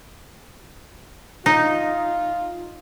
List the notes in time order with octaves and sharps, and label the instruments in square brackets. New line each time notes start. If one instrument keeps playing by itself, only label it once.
[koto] D#4 [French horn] F4